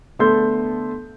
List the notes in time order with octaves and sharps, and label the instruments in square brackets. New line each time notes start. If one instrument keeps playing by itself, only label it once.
[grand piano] D3 A3 B3 A4 C6 G6